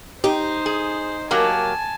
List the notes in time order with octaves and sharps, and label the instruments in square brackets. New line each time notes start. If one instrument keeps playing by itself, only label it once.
[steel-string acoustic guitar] D#4 [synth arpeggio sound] G4 [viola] C5
[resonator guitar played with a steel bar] G#4
[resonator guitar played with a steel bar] F#3 A#3 G4 [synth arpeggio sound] A#4 [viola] G#5 A5